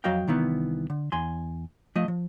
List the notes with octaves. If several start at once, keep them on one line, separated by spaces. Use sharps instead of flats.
F2 F#3 F#4 D#5 F5 G5
C2 D#3 E3 B3
D3
E2 G#5 C6
F3 A3 D#5
F3